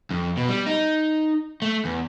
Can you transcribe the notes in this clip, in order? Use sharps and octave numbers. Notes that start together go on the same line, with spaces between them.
F2
B2
G3
D#4
A3
E2